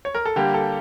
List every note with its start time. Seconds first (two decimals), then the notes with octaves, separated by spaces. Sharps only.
0.05 C#5
0.15 A#4
0.26 A4
0.36 D3 G3 A#3 G4
0.54 A4